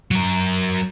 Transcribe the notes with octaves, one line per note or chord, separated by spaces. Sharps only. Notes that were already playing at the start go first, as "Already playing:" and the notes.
F#3 A#4